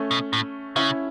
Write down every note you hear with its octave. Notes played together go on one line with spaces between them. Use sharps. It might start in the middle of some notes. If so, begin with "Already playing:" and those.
Already playing: A3 C#4
B2
A2
C#3 C#4 E4